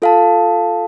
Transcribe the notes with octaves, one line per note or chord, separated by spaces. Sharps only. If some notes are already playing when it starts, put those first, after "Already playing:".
F4 A4 F5 A5